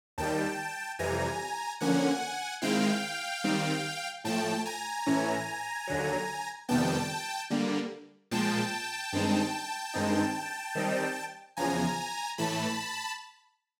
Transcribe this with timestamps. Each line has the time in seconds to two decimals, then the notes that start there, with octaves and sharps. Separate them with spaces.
0.18 D#2 D#3 G3 G5 A5
0.99 F2 C3 E3 G3 G#5 A#5
1.81 D3 F3 A#3 C#4 F#5 G#5
2.62 D#3 G#3 C4 E4 F5 G5
3.44 D#3 G3 C4
4.24 A2 F3 A3 G5 A5
4.66 G#5 A#5
5.06 A2 E3 A3 C#4 E4
5.87 D#2 D3 F#3
6.69 F2 C3 D#3 G3 B3 G5 A5
7.50 D3 G3 A#3
8.31 A#2 F3 G#3 G5 A5
9.13 G2 D#3 G#3 C4 D#4
9.94 G2 D#3 G#3 C4 D#4
10.75 D#3 G3 C4 D#4
11.57 E2 C#3 F3 G#5 A#5
12.38 A2 E3 A3 A5 B5